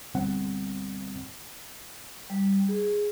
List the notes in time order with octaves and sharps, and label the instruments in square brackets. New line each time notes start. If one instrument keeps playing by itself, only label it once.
[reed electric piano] D2 B2 G3 C4 F#5
[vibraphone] G3
G#4